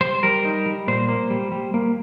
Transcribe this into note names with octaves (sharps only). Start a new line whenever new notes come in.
G3 C5
G3 A#4
D#4
G3
A#2 C5
A#3
G3
G3
A#3